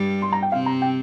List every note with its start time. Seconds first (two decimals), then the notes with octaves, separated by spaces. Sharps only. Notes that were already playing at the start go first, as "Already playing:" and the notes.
Already playing: G2 G3
0.22 C6
0.32 A#5
0.43 G5
0.52 C3 C4 F5
0.66 A#5
0.82 G5